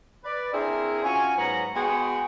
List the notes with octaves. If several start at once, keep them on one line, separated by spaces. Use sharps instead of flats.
B4 D5
C4 D4 E4 G#4 A#4 C5
C#4 F4 F#4 G#5
G#2 F#3 B3 C#5 F#5 A#5
G#3 B3 F#4 G#4 F#5 G5